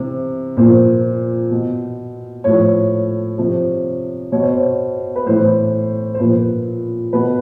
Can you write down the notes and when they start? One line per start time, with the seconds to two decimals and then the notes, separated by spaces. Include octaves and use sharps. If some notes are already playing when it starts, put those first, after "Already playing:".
Already playing: C3 E3
0.57 A#2 F3 C5
1.51 B2
2.44 A2 F3 C#5
3.38 C3 F3
4.32 B2 C#5
4.42 C5
4.52 C#5
5.16 B4
5.26 A2 E3 C5
6.14 C5
6.20 A#2 F3 B4
7.13 B2 B4